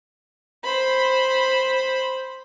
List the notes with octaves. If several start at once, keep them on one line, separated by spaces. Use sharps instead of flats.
C5 B5